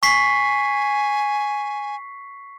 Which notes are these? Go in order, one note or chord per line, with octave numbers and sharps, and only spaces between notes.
G#5 C#6 B6 C7